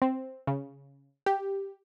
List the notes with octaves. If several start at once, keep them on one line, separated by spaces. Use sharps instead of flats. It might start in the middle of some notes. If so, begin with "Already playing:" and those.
C4
C#3
G4